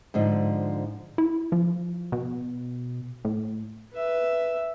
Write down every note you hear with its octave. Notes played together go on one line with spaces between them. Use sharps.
G#2 D3 F3
E4
F3
B2
A2
B4 E5